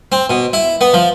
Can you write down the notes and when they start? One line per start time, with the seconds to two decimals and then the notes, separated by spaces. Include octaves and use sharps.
0.12 C4
0.30 B2
0.53 E4
0.81 B3
0.94 F3